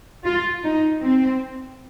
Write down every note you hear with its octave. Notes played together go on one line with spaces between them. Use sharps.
F4
D#4
C4